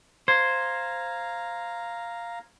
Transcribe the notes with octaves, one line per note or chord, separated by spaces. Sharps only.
C5 F5 A#5 G#6